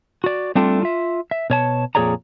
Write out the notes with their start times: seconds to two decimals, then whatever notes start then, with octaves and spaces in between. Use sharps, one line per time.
0.24 F#4 D5
0.55 G3 A3 C4 D4 F4 A4
0.83 F4 E5
1.31 E5
1.50 B2 C#5 A5
1.95 F2 A#2 G#4 C#5 D5 A#5